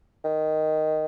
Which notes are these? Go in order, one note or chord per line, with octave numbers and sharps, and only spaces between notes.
D#3